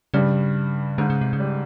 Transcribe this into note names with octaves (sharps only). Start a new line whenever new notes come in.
G2 C#3 G3
G#2 D3 G#3
C#3
C3
C#3
G3